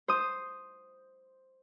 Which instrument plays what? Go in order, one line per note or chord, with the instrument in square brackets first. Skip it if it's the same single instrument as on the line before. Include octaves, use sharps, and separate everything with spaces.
[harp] C5 D#6